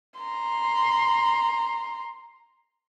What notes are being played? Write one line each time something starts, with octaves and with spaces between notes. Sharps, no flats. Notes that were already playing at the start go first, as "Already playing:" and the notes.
A#5 C6